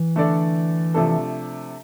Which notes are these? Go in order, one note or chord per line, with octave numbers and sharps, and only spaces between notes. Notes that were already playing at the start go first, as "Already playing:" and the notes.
Already playing: E3
D3 A3 D4 A4 D5
C3 F3 A3 D4 A4